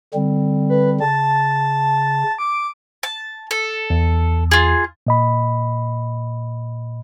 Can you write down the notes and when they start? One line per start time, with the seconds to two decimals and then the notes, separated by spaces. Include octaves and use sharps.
0.14 D3 G3 C4
0.69 B4
1.00 C#3 A5
2.38 D6
3.03 A5
3.51 A4
3.90 E2
4.51 F4 G#4
5.07 A#2 D#5 B5